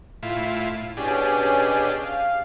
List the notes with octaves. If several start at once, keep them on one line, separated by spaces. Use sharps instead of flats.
A2 E4 F4
B2 C#4 D4 G4 G#4
F5